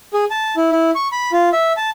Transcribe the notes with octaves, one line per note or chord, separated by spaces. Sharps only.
G#4
A5
E4
E4
C#6
B5
F4
E5
A5